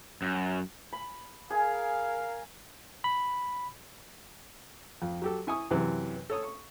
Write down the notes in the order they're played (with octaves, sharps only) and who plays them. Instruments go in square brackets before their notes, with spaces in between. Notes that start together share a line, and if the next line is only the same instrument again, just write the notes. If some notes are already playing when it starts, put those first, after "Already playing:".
[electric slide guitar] F#2
[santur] B5
[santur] G#4 G#5 [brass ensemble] A#4 F5
[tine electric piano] B5
[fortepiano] F2
F#3 G4 A4
E4 G#5 C#6 D#6
F#2 C3 E3
A4 C#5 D#6
C#6